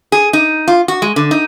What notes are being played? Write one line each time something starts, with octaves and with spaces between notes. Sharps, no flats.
G#4
D#4
F4
F#4
G#3
D3
D#4